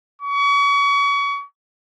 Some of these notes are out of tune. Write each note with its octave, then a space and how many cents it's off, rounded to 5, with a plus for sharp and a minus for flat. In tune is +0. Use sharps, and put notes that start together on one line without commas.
C#6 +35